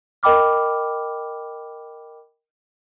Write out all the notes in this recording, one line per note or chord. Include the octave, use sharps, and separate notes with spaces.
A#4 D#5 G5 B5 D6 F6